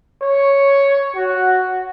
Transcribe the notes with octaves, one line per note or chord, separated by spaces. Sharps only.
C#5
F#4